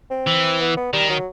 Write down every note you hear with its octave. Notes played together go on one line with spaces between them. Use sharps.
C4
E3
B3
B3
D#3 G3
F#3